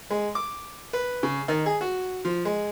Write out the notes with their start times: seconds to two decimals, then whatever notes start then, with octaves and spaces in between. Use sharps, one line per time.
0.10 G#3
0.35 D6
0.93 B4
1.23 C#3
1.48 D#3
1.66 G#4
1.81 F#4
2.25 F3
2.45 G#3